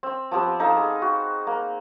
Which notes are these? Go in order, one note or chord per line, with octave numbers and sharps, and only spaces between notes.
C4 E6
F3 B3 C4 G4
D#4 A4 F5
G#4
F#4
A#3